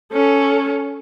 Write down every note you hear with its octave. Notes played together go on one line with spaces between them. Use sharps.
C#4 A4